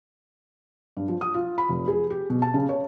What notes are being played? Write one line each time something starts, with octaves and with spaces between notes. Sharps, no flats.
G2
F3
D#6
F4
B5
F1
G#4
G4
B2
A5
C#3
C#5